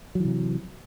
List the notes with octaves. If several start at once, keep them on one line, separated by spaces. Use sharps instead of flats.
C3 E3 F#3